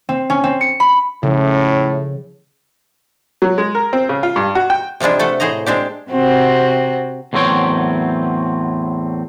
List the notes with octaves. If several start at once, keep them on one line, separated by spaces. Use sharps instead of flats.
C4
C#4
C4
C#7
B5
A2 C#3 F3
F#3
G#3
A#4
C4
C#3
F4
G2
F#4
G5
C3 F3 G3 G#3 D4
A3 A4 F#5
A2 G#4 C5 D#5 A#5
G#3 C4 D4 G4
C3 C4 F#4
E2 A2 F#3 C4 C#5 G5